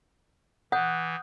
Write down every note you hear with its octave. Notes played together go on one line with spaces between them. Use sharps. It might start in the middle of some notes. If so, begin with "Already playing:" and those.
E3 F#5 D#6 F#6 G6